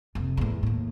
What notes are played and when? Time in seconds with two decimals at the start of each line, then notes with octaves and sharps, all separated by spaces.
0.15 F1 C3
0.37 E2 A2
0.63 D#2 A2